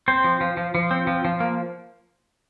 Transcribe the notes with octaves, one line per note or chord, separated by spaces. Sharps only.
C4 C5
F3
F3
F3
F3
C4
F3
F3
A#3